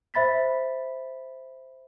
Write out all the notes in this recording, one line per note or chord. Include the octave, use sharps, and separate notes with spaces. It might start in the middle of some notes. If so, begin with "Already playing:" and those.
C5 E5 B5 A6 B6